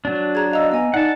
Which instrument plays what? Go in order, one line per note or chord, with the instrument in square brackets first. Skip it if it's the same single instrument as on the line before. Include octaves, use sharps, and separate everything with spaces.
[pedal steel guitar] F#3 D4
[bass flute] G#4 [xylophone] A#5 G#6
[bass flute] D#5 [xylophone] F5 A#5 E6
[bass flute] B3 [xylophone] D#5 G#5 A#5
[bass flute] D#4 [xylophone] D5 [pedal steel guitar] F#5 A5